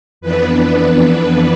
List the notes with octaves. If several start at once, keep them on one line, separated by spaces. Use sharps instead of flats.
F2 E3 B3 D4 B4